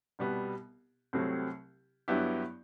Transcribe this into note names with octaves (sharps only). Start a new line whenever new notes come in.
C2 B2 G3 B3
C2 C3 F#3 A3 C4
G2 F#3 B3 E4 G4